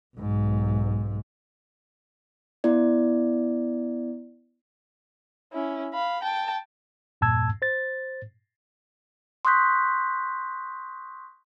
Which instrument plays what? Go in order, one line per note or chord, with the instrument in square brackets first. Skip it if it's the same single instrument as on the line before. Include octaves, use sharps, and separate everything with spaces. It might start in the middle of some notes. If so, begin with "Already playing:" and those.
[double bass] B1 G#2
[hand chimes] B3 E4 D5
[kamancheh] C#4 E4
F5 B5
G5 A5
[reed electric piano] E2 G2 A#2 A5 E6 G#6
C5 A6
[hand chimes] C6 C#6 D#6 F#6 G6 B6